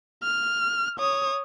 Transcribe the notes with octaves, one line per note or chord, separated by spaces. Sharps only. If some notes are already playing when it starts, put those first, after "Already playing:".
F6
C#5 D#6